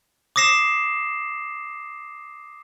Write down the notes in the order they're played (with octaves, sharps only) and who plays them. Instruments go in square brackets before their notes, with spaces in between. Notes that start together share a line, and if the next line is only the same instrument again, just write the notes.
[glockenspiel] D6 D#6 A#6 C7 E7